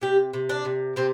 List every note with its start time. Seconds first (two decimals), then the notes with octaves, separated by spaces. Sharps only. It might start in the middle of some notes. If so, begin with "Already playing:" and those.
0.02 C3 G4
0.33 C3
0.49 D4
0.65 C3
0.96 C3 C4